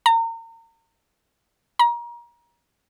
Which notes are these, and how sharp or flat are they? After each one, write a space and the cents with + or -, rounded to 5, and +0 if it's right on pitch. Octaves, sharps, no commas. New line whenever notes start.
A#5 -35
A#5 +30